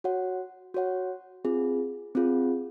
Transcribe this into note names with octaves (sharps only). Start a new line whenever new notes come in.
F#4 C#5 F#5
F#4 C#5 F#5
C4 F4 G#4
C4 F4 G#4